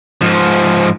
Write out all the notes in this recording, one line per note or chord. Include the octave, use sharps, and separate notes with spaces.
G#2 F3